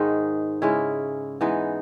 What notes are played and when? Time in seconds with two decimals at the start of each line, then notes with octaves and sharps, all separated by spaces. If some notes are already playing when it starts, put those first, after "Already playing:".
Already playing: G#2 D#3 G#3 D#4
0.62 C#3 G#3 C#4 E4
1.41 E3 G#3 B3 D#4